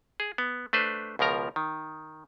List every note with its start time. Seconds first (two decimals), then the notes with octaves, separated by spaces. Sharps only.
0.20 G#4
0.38 B3
0.73 A3 D4 B4 C5
1.19 C#2 B2 F3 A#4 A#5
1.56 D#3